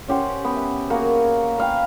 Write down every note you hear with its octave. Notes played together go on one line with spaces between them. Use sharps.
C#4 G4 C5 F#5
B3
E5
A#3 F#4 G#4 A#4
B4 F5 G5